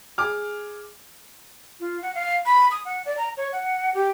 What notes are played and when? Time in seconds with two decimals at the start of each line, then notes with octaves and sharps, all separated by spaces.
0.18 G#4 D6 F6
1.80 F4
2.02 F#5
2.15 F5
2.46 B5
2.71 D#6
2.85 F#5
3.06 D5
3.17 A#5
3.37 C#5
3.53 F#5
3.94 G4